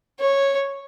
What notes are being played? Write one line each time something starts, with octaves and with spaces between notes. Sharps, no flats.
C#5